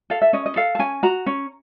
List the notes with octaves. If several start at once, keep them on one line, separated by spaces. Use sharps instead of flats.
A4 F5
E5
C#4 D#5
D#5
A4 F5
A5
C#4 G#5
F#4 A#5
C#4